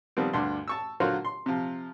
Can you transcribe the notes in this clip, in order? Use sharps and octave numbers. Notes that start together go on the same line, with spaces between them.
D#3 F3 G3 B3 C4
D2 G2 D4 C6
A5 C#6 E6
D3 F#3 F4 F#4 A#4 C5
C6
C3 F3